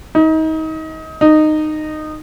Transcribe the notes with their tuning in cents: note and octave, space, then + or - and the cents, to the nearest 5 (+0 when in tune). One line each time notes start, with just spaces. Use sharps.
D#4 +30
D#4 -15